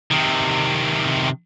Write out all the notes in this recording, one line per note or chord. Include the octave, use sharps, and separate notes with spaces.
C3 D#3